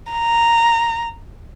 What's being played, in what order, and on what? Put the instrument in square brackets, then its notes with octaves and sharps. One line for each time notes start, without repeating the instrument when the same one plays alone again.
[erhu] A#5